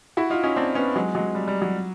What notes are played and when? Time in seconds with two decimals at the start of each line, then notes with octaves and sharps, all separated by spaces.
0.17 E4 F#4
0.30 D#4 F4
0.43 C#4 D#4
0.56 C4 D4
0.75 B3 C#4
0.96 F#3 G#3
1.15 F#3 G#3
1.35 G3
1.48 G3
1.62 F#3